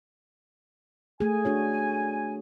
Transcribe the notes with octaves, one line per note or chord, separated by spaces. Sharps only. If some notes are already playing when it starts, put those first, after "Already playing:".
A3 G#4 G#5
D4 F#4 C#5